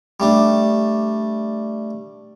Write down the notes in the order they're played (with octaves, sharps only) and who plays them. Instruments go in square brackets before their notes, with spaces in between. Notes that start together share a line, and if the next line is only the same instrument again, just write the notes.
[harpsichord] G3 A3 D4